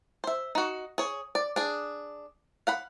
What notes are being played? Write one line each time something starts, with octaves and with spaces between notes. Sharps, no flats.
C5 E5
D#4 F#4
G#4 C#5
D5
D4 G#4
F5 F#5 B5